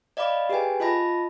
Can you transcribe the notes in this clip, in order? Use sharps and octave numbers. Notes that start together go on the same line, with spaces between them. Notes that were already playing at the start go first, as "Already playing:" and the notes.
D5 D#5 F5 B5 D6
G4 G#4 B4 G5 G#5
F4 D#5 A5 B5 A#6